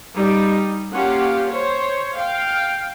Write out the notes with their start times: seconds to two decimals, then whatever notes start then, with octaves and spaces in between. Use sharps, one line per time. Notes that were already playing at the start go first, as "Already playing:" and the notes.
0.15 G3 D#4
0.92 A#3 C#4 F4 G4 F5 F#5
1.51 C5 C#5
2.15 F5 G5